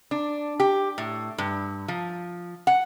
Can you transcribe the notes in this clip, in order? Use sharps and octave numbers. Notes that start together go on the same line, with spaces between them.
D4
G4
A2
G2
F3
F#5